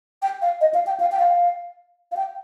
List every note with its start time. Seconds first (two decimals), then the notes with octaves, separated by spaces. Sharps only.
0.22 G5
0.42 F5
0.61 D#5
0.74 F5
0.87 G5
1.00 F5
1.12 G5
1.19 F5
2.12 F5
2.17 G5